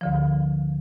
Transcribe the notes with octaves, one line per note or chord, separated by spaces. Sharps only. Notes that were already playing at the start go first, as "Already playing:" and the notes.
D2 D3 F3